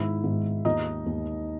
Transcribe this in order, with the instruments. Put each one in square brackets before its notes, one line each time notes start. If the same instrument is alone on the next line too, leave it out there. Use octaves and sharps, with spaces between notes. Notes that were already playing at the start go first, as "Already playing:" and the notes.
Already playing: [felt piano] G#2 D#3 E4 E5
G#2 D#3
D#2 D#3 D#4 D#5
D#2 D#3